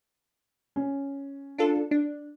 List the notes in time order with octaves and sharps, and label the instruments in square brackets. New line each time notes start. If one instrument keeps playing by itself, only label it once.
[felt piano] C#4
[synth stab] D4 F4 A4
D4